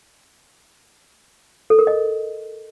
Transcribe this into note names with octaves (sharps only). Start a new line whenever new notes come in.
A4
A#4
D#5